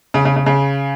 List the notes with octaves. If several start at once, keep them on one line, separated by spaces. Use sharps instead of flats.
C#3
C#3
C#3
C#3